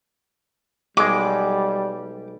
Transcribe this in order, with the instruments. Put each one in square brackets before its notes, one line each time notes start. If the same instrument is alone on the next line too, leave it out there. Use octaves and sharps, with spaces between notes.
[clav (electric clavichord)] B1 G#3 [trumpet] G3 [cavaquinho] D6